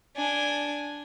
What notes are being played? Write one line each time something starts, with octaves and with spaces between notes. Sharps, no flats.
D4 G#5